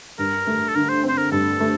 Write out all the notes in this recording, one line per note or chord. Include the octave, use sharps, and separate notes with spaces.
G2 A#4
A3
A4
D3 A#4
C5
C4
C5
A#4
G2 A4
A3